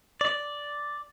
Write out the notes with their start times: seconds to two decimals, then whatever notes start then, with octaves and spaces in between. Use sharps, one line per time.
0.21 D5